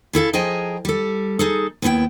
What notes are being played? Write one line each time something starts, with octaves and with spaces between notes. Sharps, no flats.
C#3 E4 A4 F5
F3 G#4 D#5 G5 G#5 A#5
G3 A4
D#4 G#4 A4
D#2 B3 E4 F#5 G5